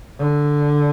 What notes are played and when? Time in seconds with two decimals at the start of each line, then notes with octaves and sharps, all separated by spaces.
0.19 D3